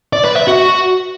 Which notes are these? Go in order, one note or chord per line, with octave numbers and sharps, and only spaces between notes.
D5
B4
E5
F#4